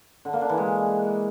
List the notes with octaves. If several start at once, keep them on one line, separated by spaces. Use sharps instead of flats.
D3
A#3
D4
E3
G#3